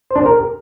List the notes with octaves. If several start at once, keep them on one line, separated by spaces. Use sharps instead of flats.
C5
D4
C5
A#4